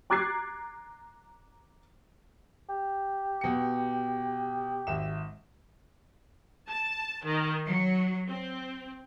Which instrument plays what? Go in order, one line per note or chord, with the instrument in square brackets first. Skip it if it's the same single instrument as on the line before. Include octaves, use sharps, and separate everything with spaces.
[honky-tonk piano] A#5 D6 F#6 G#6 A6 C7
[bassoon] G4
[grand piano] B2 C#7
G#1 E5 E7
[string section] A5
D#3
F#3
C4